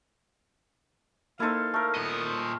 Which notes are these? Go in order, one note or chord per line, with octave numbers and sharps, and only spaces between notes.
A#3 D#4 E4 A4 C5 F5
A3 A#4
A#2 B3 D#5
C5